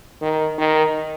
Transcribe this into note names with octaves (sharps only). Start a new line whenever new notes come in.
D#3
D#3